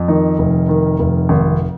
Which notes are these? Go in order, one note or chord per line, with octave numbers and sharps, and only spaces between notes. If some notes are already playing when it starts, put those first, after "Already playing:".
Already playing: F2
D#3 D#4
F1
D#3
F1
G#1